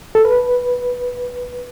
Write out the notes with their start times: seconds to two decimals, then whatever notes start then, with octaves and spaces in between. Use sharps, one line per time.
0.15 A4
0.25 B4